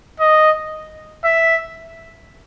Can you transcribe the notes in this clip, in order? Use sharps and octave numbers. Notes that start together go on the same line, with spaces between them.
D#5
E5